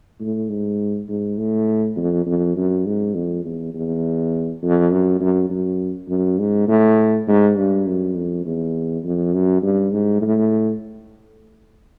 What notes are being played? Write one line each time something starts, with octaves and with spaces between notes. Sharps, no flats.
A2
G#2
G#2
A2
F2
F2
F#2
G#2
F2
E2
E2
F2
F#2
F#2
F#2
F#2
G#2
A2
G#2
G2
F#2
F2
E2
F2
F#2
G2
G#2
A2